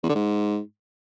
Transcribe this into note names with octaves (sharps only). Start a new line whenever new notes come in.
E2
D3
G#2